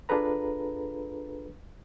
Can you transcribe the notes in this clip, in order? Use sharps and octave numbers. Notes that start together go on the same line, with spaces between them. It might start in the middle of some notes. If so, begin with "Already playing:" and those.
D4 F4 G#4 A4 B4 A#5